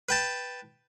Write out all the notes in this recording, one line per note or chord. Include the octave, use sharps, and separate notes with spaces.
B4 G5 A5